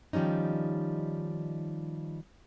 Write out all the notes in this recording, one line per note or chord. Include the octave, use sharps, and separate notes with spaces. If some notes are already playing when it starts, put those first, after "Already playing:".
D#3 F3 G3 C#4 D#4